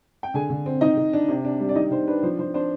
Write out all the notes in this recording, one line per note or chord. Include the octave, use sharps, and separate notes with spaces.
G5
D3 G#4 G#5
D3
C4
D#3 D#4 D#5
D#3
D4
C3
D4
G3
D5
D#3 D#4 D#5
D#3 C5
D4 B4
F3 C5
F3 C5
D4 C5